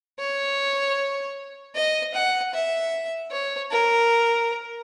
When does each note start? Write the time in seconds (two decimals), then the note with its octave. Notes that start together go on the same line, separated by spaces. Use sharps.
0.19 C#5
1.75 D#5
2.14 F#5
2.53 E5
3.31 C#5
3.71 A#4